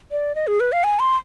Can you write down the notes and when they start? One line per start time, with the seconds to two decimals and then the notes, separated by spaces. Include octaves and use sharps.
0.11 D5
0.35 D#5
0.47 G#4
0.60 B4
0.72 F5
0.84 G#5
0.99 C6